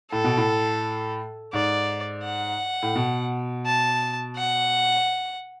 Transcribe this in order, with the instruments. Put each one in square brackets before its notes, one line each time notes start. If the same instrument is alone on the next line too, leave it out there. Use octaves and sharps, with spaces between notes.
[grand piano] A2 [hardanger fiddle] A4
[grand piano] B2
A2
[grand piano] G#2 [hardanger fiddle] D5
[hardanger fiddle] F#5
[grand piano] A2
B2
[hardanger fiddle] A5
F#5